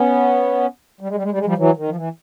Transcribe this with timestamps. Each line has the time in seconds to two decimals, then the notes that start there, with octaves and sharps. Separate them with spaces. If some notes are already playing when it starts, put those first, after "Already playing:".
Already playing: B3 C#4
1.01 G3
1.09 G#3
1.16 G3
1.23 G#3
1.31 G3
1.38 G#3
1.46 F3 G3
1.57 E3 F#3
1.77 D#3
1.88 F3
1.96 E3